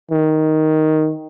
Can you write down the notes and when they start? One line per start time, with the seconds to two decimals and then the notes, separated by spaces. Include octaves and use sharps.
0.11 D#3